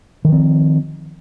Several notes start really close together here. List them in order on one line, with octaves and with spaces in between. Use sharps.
D#3 F3 C4